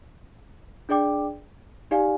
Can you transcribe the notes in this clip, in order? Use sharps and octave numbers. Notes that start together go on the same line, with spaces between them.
D4 G#4 D5 G5 D6
D#4 G4 D5 F5 G#5